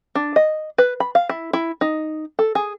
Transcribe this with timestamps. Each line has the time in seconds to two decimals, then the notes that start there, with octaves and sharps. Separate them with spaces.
0.15 D4
0.36 D#5
0.78 B4
1.00 B5
1.15 F5
1.29 E4
1.53 E4
1.81 D#4
2.39 A4
2.55 G#4